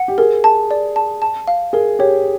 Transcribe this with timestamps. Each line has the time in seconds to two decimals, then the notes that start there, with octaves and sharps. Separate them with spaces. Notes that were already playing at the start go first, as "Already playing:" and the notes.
Already playing: F#5
0.08 G4
0.18 G#4 A#4
0.44 A5
0.71 D5
0.96 A5
1.22 A5
1.48 F5
1.73 G#4 A#4
1.99 G4 C#5